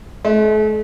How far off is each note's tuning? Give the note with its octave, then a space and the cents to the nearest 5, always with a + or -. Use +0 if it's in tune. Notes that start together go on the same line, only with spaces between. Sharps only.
A3 -45